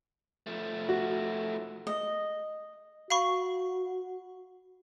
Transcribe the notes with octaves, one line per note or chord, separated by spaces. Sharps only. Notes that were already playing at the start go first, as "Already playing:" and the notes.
F3 A3
F#4
D#5
F#4 F5 B5 C#6